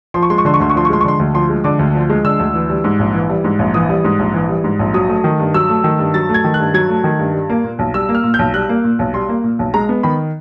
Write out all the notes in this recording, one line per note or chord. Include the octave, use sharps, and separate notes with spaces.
F3 C6
C#6
G#3 C6
C#6
D3 C6
C#6
D2 C6
C#6
F3 C6
C#6
G#3 C6
C#6
D3 C6
D2
F3 C6
G#3
D3 D6
D2
F3
G#3
D3 E6
D2
E3
G3
G#2
A#1
E3
G3
G#2
A#1
E3 D#6
G3
G#2
A#1
E3
G3
G#2
A#1
F#3 D#6
A3
D#3
G2
F#3 E6
A3
D#3
G2
F#3 A6
A3
G#6
D#3
F#6
G2
F#3 G#6
A3
D#3
G2
G3
A#3
A#2
B1
G3 E6
A#3
F6
A#2
G6
B1
G3 F#6
A#3
A#2
B1
G3 C6
A#3
A#2
B1
G#3 A#5
B3
D#3 B5